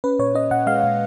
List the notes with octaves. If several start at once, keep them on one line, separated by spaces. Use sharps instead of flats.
C#4 B4
A#2 C#5
C#4 D#5
A#2 F#5
G#3 F5
A#2